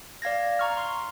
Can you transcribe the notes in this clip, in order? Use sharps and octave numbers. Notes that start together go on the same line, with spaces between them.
D5 F5 G#6 A#6
A#5 C#6 F6
C6 F6